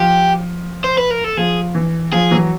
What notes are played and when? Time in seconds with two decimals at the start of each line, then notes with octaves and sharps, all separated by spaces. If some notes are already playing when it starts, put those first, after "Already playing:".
Already playing: F3 G4
0.84 C5
0.98 B4
1.11 A#4
1.24 A4
1.37 F3 G#4
1.75 E3
2.13 F3 G#4
2.31 E3 F#3